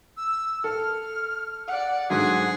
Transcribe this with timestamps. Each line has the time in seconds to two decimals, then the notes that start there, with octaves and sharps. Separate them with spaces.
0.17 E6
0.64 A4 F6
1.68 D5 F#5
2.10 G#2 D3 F#3 G#4 F#5 F#6